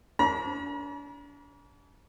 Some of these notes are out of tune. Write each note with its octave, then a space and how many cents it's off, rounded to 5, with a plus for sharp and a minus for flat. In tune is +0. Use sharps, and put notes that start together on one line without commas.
D4 -40 A#5 +45